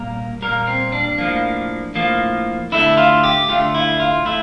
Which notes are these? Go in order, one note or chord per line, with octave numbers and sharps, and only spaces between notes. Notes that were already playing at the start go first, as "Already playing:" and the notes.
Already playing: A#2 G3 A#3 A#4
A#2 G3 A#3 A#4
C4
D4
A2 F3 A#3
A2 F3 A#3
D3 A3 E4
F4
G4
D3 A3 F4
E4
F4
A3 E4